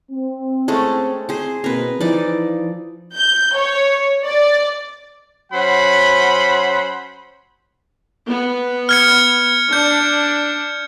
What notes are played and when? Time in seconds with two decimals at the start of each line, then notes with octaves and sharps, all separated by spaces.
0.12 C4
0.68 G#3 A3 C#4
1.29 G#4 C5
1.64 B2 A#3 C4 A#4 B4
2.00 E3 F3 D#4 D5
3.14 G6
3.55 C#5
4.26 D5
5.53 F#3 C#4 C5 F#5 B5
8.27 B3
8.89 F6 G#6 C#7
9.73 D4 G6